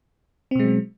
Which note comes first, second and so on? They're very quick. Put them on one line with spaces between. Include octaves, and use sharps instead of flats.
C4 B2 G#3 F#3